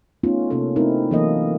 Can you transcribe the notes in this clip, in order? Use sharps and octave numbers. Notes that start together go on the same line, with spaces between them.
A3 B3 C#4 D#4 F4
C3 A#3 C#4 A4
A3 C4 D#4 E4 A#4
E3 F#3 A#3 A4 D#5